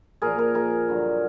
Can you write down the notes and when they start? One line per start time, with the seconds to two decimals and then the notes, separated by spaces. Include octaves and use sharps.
0.22 A#2 F3 G#4 A#4
0.38 G#4 A#4
0.55 G#4 A#4
0.88 G2 D3 F#3